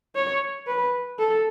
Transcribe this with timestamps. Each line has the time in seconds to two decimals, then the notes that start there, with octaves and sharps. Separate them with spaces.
0.15 C#5
0.68 B4
1.19 A4